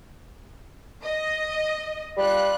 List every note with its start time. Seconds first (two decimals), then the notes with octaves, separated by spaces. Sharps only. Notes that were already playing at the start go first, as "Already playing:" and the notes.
1.03 D#5
2.17 G3 F4 F#6